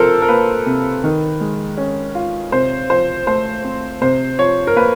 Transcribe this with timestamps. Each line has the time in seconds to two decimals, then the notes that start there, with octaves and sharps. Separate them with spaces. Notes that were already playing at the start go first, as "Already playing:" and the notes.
Already playing: C3 F3 A4 A#4 C5
0.22 A#4
0.29 A#3 B4
0.66 C3
1.04 D#3
1.41 G#3
1.78 C#4
2.15 F4
2.52 C3 C5
2.90 F3 C5
3.27 A3 C5
3.64 C4
4.01 C3 C5
4.39 F3 C#5
4.67 A#4
4.76 A#3 B4